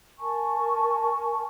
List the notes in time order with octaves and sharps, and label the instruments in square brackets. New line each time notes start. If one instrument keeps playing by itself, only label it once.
[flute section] A#4 G#5 A5 C#6